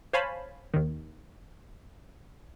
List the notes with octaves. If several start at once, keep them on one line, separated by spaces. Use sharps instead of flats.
C5 C#5 F5 G#5 A5 B5
D#2 D#3